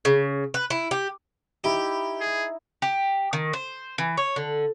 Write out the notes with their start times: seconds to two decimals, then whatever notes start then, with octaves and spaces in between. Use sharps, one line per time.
0.05 C#3
0.54 B4
0.70 E4
0.91 G4
1.64 D#4 E4 G4
2.21 G#4
2.82 G4
3.33 D#3
3.53 C5
3.98 E3
4.17 C#5
4.36 D3